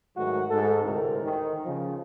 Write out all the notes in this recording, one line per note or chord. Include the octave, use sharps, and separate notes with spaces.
G#2 D#3 F#3 A3 F#4
G#2 A4
D2 A2 C3 C4 A#4
D#3
C#3 F3